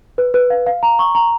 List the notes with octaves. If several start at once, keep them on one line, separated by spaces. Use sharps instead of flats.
B4
B4
F5
F5
A#5
C#6
A#5